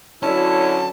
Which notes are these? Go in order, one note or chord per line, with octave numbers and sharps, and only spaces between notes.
D3 F#3 C#4 E4 A5